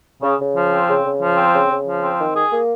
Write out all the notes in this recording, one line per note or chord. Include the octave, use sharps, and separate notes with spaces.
C#3
C#3
F3
C4
C#3
C#3
F3
C4
C#3
C#3
F3
C4
D#3
G#4
A#3